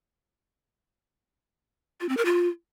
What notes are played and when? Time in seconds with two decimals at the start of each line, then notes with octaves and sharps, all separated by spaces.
2.01 F4
2.09 C4
2.17 A#4
2.25 F4